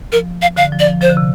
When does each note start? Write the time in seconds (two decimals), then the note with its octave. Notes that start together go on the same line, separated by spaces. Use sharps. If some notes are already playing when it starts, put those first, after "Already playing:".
0.12 F3 A#4
0.42 F5
0.56 D3 F5
0.72 F3
0.80 D5
0.87 F3
1.01 F3 C5
1.09 D3
1.17 C3